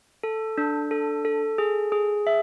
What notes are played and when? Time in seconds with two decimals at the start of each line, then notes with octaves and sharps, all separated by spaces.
0.23 A4
0.58 D4
0.91 A4
1.25 A4
1.58 G#4
1.92 G#4
2.27 E5